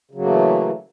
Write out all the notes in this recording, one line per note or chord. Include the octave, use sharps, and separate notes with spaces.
C#3 E3 F#3 A3 A#3